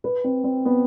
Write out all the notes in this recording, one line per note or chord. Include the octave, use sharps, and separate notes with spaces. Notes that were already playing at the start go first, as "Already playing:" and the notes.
B4
C4
C4
B3